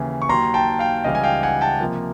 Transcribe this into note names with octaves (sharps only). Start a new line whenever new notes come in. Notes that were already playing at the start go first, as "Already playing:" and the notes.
Already playing: D#2 C#3 E3
C#6
D#2 D#3 F#3 A#5 C6
G5 A5
F5 G5
C#2 C#3 E3 G3 D#5 F5
G#5
F5 G5
F#5 G#5
G5 A5
C3 F3 A#3